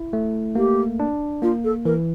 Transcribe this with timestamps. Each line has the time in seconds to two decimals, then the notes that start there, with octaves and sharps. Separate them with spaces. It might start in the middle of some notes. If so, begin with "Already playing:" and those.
Already playing: E4
0.13 A3
0.55 A#3 G4
1.00 D4
1.42 A#3 F4
1.64 A4
1.85 E3 A#4